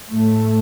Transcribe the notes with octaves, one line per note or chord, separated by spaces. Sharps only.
A2 A3